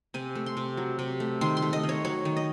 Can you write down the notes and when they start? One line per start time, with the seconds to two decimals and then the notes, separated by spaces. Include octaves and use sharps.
0.14 C3 G#5
0.35 A3
0.46 C6
0.57 C3
0.77 F#3
0.99 C3
1.20 A3
1.41 D#3 C6
1.57 C6
1.62 A3
1.73 D#5
1.83 D#3
1.89 C#5
2.05 F#3 C#5
2.25 D#3
2.37 D#5